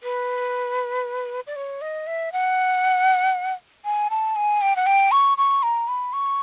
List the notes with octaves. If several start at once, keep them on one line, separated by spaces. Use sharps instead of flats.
B4
D5
C#5
D#5
E5
F#5
G#5
A5
G#5
G5
F#5
G5
C#6
C#6
A#5
B5
C#6